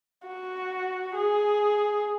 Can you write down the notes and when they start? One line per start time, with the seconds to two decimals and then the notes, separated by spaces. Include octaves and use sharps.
0.27 F#4
1.16 G#4